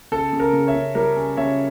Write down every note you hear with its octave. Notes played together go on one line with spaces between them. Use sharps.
C#3 A4
C#3
A#4
C#3
C#5 E5
C#3
G3 A#4
C#4
C#3 C#5 E5